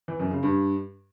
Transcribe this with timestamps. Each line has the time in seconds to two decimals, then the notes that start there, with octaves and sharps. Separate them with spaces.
0.08 E3
0.20 F#2
0.31 C#3
0.43 G2